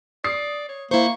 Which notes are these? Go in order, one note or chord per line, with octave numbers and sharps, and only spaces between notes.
D5 D#6 C7
C#5
A#3 E4 C5 C#6